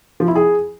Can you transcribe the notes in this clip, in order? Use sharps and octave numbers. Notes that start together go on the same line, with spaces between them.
F3
E4
G#4